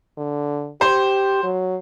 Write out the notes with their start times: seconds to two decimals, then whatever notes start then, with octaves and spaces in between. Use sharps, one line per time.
0.17 D3
0.81 G4 C5
1.43 F#3